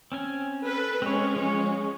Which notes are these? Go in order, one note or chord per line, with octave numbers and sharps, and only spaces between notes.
C4 C#4 G#5
A4 B4
G#3 C4 C#4 C#5
F3 C#5